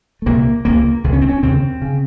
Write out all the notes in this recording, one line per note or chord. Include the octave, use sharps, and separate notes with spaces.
A3
C2 A#2 A#3
C#2 C#3 A#3
C#2 C#3
C#4
C4
C#4
D#2 C#3 C4
C#3